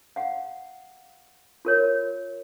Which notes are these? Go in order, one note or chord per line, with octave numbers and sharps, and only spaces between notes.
F5 F#5
F4 A#4 C#5